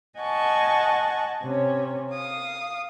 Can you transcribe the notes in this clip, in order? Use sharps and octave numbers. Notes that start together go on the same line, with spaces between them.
D#5 F#5 G#5 A5 C#6
C3 C#4
F5 D#6